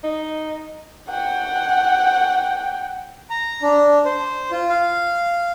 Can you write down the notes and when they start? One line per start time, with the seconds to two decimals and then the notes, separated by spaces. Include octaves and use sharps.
0.04 D#4
1.09 F#5 G5
3.30 A#5
3.62 D4
4.05 C5
4.51 F4
4.69 F5